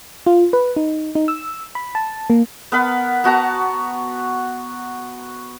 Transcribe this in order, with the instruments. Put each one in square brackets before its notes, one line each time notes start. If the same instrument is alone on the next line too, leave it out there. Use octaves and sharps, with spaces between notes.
[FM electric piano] F4
B4
D#4
D#4
E6
B5
A5
A#3
[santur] B3 A#4 B4 F#5
B3 F#4 A5 A#5